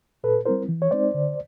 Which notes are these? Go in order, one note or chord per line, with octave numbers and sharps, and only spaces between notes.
A#2 A4 B4
G3 C4 E4 A#4 C5
E3
C#5
G#3 C4 D#4 C5 D5
D3